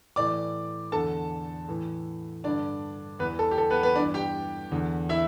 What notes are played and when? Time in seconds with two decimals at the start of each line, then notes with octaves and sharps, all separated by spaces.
0.16 A2 E3 D5 D6
0.92 E2 D3 A4 A5
1.68 A2 E3
2.44 G2 D3 D4 D5
3.19 E2 E3 B3 B4
3.39 A4
3.51 G4
3.58 A4
3.70 B3 B4
3.83 B3 B4
3.95 E3 D4 D5
3.99 G2
4.14 G4 G5
4.72 E2 D3
5.09 E4 E5